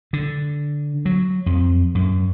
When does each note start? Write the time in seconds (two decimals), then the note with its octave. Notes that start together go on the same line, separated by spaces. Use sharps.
0.13 D3
1.06 F#3
1.46 F2
1.95 F#2